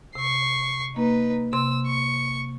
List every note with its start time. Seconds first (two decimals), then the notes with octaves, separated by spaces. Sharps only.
0.15 C3 C#6 C7
0.96 A#3 D#4 B4
1.53 C3 C6 E6
1.87 C#6 C#7